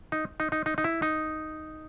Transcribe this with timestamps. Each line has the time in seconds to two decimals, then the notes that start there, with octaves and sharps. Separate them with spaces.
0.12 D#4
0.40 D#4
0.52 D#4
0.66 D#4
0.78 D#4
0.84 E4
1.02 D#4